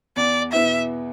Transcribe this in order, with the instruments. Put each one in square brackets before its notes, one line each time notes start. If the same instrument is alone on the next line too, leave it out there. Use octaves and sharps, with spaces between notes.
[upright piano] E2 [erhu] D5
[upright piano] B2 B3 E4 [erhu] E5